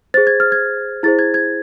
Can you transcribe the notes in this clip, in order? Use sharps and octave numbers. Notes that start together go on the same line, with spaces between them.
G#4 C5 A6
G#6
F6
G#6
E4 G#4 C5 A6
G#6
G#6